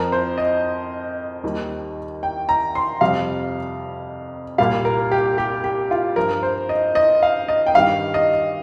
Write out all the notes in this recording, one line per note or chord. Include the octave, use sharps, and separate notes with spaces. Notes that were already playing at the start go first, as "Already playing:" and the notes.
Already playing: F2 F3 A#4
C5
D#5
D#2 D#3 G3
G5
A#5
C6
F2 C3 G3 F5
C2 A#2 G3 F5
A#4
G4
G4
G4
F4
G2 F3 A#4
C5
D#5
D#5
F5
D#5
G5
G2 D#3 G3 F5
D#5